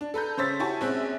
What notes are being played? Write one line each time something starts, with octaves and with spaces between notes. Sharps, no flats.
D4
A4 B4 A#5 G6
C#3 C5 C#5 E6 A6 B6
E4 F#4 G4 G#5 A5 C#6
A#1 G#3 C4 C#4 E5 F#6